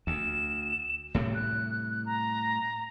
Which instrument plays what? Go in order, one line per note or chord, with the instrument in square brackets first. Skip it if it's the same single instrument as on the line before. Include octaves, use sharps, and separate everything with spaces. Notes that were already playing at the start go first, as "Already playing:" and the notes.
[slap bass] D2 [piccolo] E7
[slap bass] A2 C3 G3
[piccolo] F#6
A#5